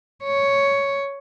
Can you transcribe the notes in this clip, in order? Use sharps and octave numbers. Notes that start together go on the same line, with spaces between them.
C#5